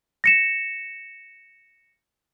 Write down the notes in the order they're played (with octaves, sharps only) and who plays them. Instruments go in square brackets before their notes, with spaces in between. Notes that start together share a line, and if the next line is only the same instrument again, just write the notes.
[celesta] A#6 C#7 E7